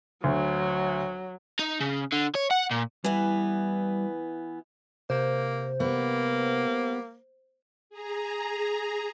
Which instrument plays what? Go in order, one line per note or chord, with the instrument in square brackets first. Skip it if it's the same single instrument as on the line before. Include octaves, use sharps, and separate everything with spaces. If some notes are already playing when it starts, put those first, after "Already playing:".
[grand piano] D2 [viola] F#3
[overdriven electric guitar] D#4
C#3
D3
C#5
F#5
A#2
[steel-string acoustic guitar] E3 B3 [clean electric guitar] G3
[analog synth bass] C3 [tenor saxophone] A#3 [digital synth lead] C5
[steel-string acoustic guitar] G3 B3 [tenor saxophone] A#3
[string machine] G#4 A#5